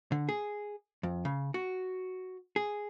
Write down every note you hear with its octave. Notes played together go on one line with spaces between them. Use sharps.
D3
G#4
F2
C#3
F#4
G#4